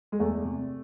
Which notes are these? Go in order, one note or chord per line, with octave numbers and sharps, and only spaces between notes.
G#3
E2 A3
C3